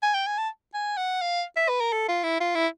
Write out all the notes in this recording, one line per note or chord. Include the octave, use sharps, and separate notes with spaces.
G#5
G5
G#5
A5
G#5
F#5
F5
E5
B4
A#4
A4
F4
E4
F4
E4